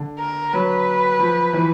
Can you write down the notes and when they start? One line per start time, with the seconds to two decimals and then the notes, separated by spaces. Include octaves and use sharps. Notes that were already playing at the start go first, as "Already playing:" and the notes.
Already playing: D3
0.19 A#4
0.53 F#3 B4
1.19 F3
1.53 E3